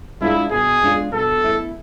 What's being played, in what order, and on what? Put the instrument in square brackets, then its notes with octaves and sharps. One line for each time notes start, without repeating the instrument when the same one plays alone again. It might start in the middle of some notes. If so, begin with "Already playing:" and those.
[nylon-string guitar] G#3 D4 F4 [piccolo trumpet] E4
[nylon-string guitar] B2 [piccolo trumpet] G#4
[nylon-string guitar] G#3 D4 F4
[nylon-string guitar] B2 [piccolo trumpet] A4
[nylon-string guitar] A3 E4